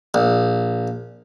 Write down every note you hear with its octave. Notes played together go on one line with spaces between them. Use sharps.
A#1